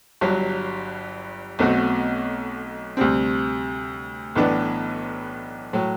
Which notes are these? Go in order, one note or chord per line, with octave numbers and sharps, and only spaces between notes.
G1 G2 F#3
B1 B2 A3 C4 F#4
D2 C3 G3 C4
B1 A2 E3 B3 D4
A2 F#3